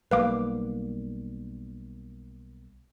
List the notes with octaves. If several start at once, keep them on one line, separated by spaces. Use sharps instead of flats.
B1 G3 A#3 B4 F5 D6